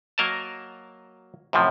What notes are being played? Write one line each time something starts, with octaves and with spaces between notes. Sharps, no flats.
F#3 A#3 A#4 D#5 A5
F#2 A2 C3 F3